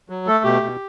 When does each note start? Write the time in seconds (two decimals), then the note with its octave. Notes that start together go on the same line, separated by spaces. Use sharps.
0.10 F#3
0.27 A3 A4
0.44 B2 G4
0.62 B2